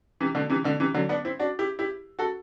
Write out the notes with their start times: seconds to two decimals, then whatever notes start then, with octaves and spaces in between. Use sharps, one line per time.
0.21 C3 E3
0.35 B2 D3
0.50 C3 E3
0.64 B2 D3
0.80 C3 E3
0.94 D3 F#3
1.09 B3 D4
1.25 C4 E4
1.39 D4 F#4
1.59 E4 G4
1.79 E4 G4
2.19 F#4 A4